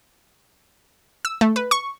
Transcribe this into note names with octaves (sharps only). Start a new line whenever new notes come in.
E6
A3
B4
C#6